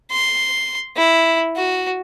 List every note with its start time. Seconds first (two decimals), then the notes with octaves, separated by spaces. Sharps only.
0.11 C6
0.97 E4
1.56 F#4